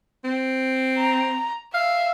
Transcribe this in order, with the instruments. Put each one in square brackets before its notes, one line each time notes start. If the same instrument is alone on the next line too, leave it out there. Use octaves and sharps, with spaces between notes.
[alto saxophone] C4
[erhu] A#5
[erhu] E5 [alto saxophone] F5